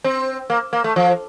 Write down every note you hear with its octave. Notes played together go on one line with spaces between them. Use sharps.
C4
A#3
A#3
A3
F3